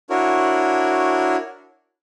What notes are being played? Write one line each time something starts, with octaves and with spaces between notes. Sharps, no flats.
D4 E4 F#4 A#4 C#5